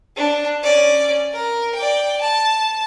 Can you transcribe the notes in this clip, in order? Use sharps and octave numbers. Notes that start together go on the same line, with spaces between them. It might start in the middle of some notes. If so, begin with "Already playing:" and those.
D4
C#4 D5
A#4
D5 G5
A5